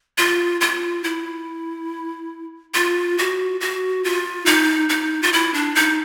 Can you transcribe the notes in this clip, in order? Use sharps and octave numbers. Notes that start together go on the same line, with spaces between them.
F4
F4
E4
F4
F#4
F#4
F4
D#4
D#4
F4
E4
D4
D#4